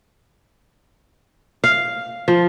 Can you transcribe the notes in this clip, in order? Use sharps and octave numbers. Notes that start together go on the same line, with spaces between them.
F5
F3